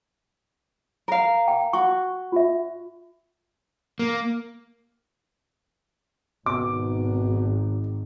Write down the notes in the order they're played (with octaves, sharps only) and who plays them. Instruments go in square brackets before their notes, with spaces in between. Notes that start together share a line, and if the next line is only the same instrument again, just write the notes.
[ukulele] A#4 F5
[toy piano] G5
[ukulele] F#4 [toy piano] C#6
[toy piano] F4 E5
[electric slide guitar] A#3
[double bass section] G#1 [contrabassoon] B2 [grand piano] D6